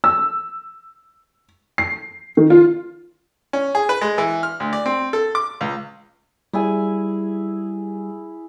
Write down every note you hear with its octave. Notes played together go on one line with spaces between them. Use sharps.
E6
C7
D#3
F4
C#4
G#4
B4
G#3
E3
F6
D2
D5
C4
A4
D6
C#2
G3 E4 G#4 G#5